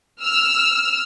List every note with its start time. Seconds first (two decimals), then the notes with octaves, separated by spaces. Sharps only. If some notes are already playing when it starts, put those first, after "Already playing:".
0.24 E6 F6